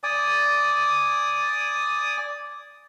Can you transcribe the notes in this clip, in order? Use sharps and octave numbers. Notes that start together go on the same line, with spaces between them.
D5 G#5 D#6